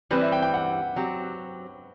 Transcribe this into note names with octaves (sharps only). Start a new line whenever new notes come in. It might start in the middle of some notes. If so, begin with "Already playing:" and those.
E3 G3 C4 B4
E5
G5
G5
F#5
F#3 C4 G4